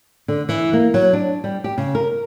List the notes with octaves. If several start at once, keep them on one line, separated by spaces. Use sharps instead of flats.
D3
E3
A#3
F#3
D4
G3
G4
C#3
A#4